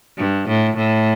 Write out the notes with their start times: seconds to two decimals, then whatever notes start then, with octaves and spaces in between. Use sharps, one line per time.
0.17 G2
0.48 A2
0.77 A2